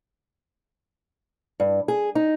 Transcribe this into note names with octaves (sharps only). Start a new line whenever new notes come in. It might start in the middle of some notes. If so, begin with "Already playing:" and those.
G2
G#4
D#4